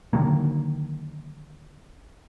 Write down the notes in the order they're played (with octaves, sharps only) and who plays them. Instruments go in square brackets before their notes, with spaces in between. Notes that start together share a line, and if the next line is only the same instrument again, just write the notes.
[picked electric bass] D3 D#3 F#3 A#3